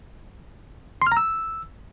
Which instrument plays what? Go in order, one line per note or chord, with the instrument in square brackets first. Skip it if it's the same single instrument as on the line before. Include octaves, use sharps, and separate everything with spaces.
[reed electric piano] C6
F6
A#5
E6